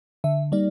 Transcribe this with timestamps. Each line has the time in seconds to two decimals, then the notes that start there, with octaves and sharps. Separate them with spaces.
0.24 D3 E5
0.52 G3 A#3 D#4 D5